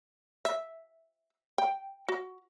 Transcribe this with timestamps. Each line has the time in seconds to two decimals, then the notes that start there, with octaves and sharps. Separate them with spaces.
0.45 E5
1.58 G5
2.08 F#4